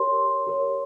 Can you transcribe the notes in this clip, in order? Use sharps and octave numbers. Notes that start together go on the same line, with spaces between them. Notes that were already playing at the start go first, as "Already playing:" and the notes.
Already playing: G4 A#4 C#5 C6
G4 A#4 C#5